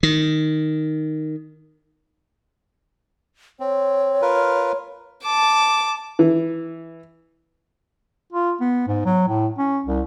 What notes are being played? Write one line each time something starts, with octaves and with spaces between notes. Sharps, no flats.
D#3
C4 C#5
F4 A#4 B4
A5 D6
E3
F4
B3
G#2
F#3
A2
C#4
C2